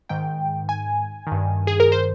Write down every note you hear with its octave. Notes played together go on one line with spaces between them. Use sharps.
G#2 D#3 G5
G#5
G2 D#3
G#4
A#4
C5